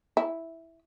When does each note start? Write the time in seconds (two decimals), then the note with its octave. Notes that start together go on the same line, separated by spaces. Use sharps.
0.17 E4